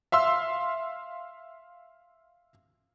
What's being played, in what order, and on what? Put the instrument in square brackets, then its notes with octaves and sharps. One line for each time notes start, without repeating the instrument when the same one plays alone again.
[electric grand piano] E5 F5 C6 E6